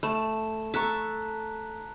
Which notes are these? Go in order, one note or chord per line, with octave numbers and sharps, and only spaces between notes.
A3 A5 B5 E7
A4 A#5 C#6 F#6 B6